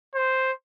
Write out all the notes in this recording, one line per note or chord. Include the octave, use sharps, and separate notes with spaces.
C5